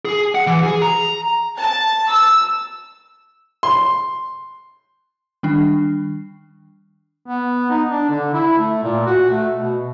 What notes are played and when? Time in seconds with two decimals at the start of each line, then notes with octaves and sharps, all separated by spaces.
0.05 G#4
0.35 F#5
0.47 E3
0.63 G#4
0.82 A#5
1.58 A5
2.10 E6
3.63 C6
5.43 D#3 G3 D4
7.26 B3
7.70 D#4
7.90 D4
8.10 D3
8.33 E4
8.58 A3
8.83 A#2
9.06 F#4
9.30 A3
9.55 B2